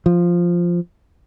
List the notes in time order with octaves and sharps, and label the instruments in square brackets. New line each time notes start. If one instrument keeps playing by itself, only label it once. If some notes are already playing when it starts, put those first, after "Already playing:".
[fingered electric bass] F3